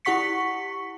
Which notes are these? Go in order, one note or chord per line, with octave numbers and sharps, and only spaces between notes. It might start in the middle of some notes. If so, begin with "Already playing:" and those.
E4 G4 F#5 C#6 B6 C#7